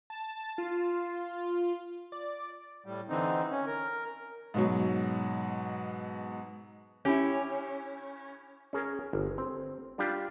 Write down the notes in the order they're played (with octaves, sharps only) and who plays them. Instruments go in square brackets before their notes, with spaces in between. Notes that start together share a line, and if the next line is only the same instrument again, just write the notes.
[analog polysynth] A5
F4
D5
[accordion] A2 G3
D3 E3 C4 D#4
C#4
A#4
[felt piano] G#2 B2 F#3
[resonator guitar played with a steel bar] C#4 [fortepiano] E4 G4
[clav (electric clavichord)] C#4 G#4 A#4
G1
C4
G3 D4 F4 G4